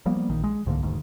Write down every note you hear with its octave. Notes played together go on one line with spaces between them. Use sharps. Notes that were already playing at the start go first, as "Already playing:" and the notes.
F3 G3 A#3 B3
A#1 D#3
G#3
C2 G#2 D3 A#3
E1 D2 G#2 D#3